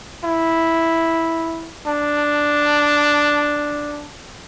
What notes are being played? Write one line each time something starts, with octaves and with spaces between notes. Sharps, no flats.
E4
D4